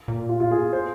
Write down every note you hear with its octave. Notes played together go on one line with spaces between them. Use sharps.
A#2
F4
F4
G#4
C5